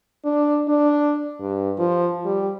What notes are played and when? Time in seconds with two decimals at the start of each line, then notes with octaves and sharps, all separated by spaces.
0.25 D4
0.68 D4
1.41 G2
1.78 F3
2.25 G3